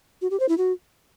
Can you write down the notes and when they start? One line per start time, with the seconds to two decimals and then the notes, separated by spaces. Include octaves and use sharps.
0.22 F#4
0.31 G4
0.40 C5
0.49 E4
0.58 F#4